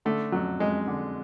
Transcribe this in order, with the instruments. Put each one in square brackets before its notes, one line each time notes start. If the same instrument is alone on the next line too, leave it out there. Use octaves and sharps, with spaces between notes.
[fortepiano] D3 A3
F2 F#3
F2 G#3
D3